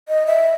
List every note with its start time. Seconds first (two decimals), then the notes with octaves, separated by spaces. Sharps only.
0.08 D#5
0.26 E5